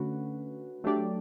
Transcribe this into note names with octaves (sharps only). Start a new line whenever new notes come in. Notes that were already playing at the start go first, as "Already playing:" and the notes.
Already playing: D3 A3 C#4 F#4 B4
F#3 A3 D4 G4 D5